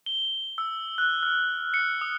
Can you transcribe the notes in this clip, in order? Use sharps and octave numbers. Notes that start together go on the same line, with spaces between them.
G7
E6
F#6
F6
C#7
D#6